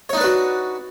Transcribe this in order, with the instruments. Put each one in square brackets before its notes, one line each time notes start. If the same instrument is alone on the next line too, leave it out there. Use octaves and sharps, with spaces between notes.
[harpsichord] C#5
D#4
D4
B4
F#4